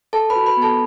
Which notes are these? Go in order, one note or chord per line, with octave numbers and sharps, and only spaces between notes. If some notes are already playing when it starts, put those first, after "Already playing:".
A4 A5
B4 B5
F#4
B4 B5
B3
A4 A5